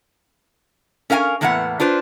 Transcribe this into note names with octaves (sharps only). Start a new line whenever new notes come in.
C#4 A#4 F5 G5 G#5
E2 A2 E3 A#3 B3 F#5
D4 F4 B4 C5